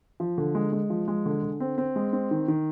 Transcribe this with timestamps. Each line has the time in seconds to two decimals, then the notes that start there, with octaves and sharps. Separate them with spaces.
0.20 F3
0.38 D3
0.55 G#3
0.72 G#3
0.90 F3
1.08 G#3
1.26 D3
1.43 D3
1.60 C4
1.78 C4
1.96 G#3
2.13 C4
2.31 D#3
2.48 D#3